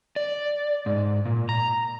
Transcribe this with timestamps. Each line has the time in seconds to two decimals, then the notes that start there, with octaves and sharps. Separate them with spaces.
0.16 D5
0.86 G#2
1.25 A#2
1.49 A#5